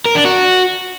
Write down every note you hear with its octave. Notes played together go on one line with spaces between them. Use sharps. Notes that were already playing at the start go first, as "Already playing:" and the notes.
A#4
D4
F#4